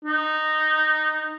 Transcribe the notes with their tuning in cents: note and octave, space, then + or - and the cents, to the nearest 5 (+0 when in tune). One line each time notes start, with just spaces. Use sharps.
D#4 -10